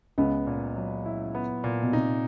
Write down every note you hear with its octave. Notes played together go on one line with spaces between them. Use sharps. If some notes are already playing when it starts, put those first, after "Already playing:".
C#2 C#3 B3
A#2
F#3
E4
B3
A#2
B2
C3 D#4